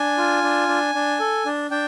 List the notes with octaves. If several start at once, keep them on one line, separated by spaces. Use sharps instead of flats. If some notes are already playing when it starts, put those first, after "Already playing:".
Already playing: D4 G#5
F4
D4
D4
D4
A4
D4
D4 G5